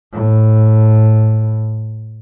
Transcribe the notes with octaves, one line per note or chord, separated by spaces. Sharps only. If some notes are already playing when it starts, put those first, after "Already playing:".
A2